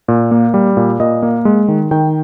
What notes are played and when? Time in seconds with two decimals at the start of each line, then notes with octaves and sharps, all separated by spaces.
0.08 A#2
0.31 A#3
0.54 G3
0.77 A#2
1.00 A#2 D#5
1.23 A#3
1.45 G#3
1.68 D#3
1.91 D#3 G5